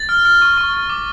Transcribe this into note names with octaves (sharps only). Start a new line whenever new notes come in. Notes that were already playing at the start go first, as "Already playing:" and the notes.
Already playing: A6
F6
F6
C#6
C#6
F6
D6